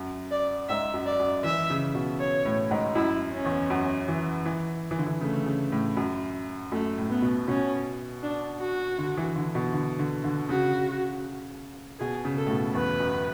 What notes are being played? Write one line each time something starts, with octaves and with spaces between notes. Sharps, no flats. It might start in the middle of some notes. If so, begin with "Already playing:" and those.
Already playing: F#2
D5
G#2 E5
F#2
D5
F#2
E3 E5
C#3
B2
C#5
A2
G#2
F#2 E4
C#4
E2
F#2
E3
E3
E3
D3
E3
C#3 A3
C#3
A2
F#2
F#2 A3
A2
B3
B2
B2 C#4
D4
F#4
D3
E3
D3
B2
D3
D3
D3
C#3 F#4
B2 G#4
C#3
A4
A2
B2
E2 B4
F#2